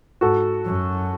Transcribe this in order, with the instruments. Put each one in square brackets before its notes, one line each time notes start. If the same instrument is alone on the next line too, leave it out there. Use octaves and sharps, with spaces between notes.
[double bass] G#2 [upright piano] F#4 A4
[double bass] F#2